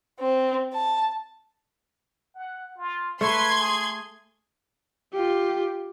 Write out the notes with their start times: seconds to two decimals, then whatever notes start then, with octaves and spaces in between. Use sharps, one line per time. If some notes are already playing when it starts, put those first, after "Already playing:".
0.20 C4
0.73 A5
2.35 F#5
2.77 F4
3.21 A3 B4 C6 G#6
3.58 G#4
5.13 F4 G4